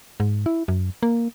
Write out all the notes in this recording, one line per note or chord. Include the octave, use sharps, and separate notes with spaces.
G#2
E4
F#2
A#3